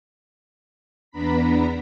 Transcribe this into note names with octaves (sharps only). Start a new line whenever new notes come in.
E2 B3 D4 A#5 B5 B6